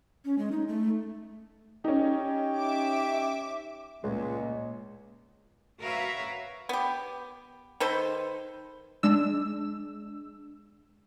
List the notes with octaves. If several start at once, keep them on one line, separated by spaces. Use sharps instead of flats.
C#4
G#3
D#4
A3
C#4 D#4 G4
E5 D6
C#2 A#2 G#3
F#4 A#4 B4 C#5 E5 F5
B3 G4
D#3 A4 B4 C5
G#3 D4 E6